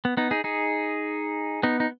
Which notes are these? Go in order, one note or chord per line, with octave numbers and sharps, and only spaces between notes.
B3
B3 D#4
D#4 G#4
D#4 G#4
B3 D#4
D#4